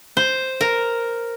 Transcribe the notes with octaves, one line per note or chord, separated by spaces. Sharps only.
C5
A#4